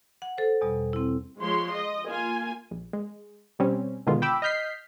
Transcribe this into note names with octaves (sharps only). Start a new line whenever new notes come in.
F#5
A4 C5
E2 B2 G3
C4 E4
F3 G#3 C#5 C6
D#5
A#3 F4 G#5
A#1
G#3
B2 G3 C4 C#4
B2 D3 D#3 G#3 B3 F4
G5 B5 D6 E6
D#5 F6 G6 B6 C7